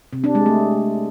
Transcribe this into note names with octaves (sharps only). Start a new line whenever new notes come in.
C3
D4
G#3
A3